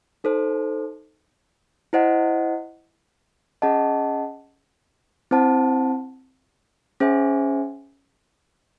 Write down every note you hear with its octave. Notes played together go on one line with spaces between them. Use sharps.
D#4 A4 C5
E4 C5 D#5 F#5
C#4 G#4 D#5 F#5 A5
C4 E4 C5 F#5 A5
C#4 G#4 C5 E5 G#5